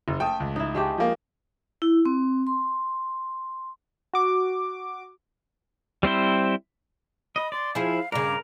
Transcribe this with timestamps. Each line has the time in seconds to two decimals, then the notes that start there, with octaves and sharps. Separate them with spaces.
0.08 F#1
0.20 A3 G5 D#6
0.40 C#2
0.56 D#4 E4
0.75 G#3 A3 G4
0.98 F3 A#3
1.82 E4
2.06 C4
2.47 C6
4.14 F#4 D6
6.03 G3 C4 E4 C5
7.36 D#5 B5
7.52 D5 C6
7.75 F3 E4 G#4 F5
8.12 G2 C#3 A#4 D6